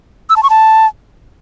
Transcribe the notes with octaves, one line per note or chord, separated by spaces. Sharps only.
E6
A5
C#6
A5